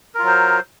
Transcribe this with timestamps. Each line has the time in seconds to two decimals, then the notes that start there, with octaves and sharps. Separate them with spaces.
0.15 A#4
0.19 F4
0.23 F#3
0.27 C5